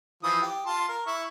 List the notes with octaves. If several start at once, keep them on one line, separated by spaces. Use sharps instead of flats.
E3 F3 D#6
G4
F4 A5 C6
A#4
E4 C#6